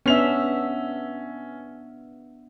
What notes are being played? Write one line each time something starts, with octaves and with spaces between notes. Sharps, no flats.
B3 C#4 D4 E5 F7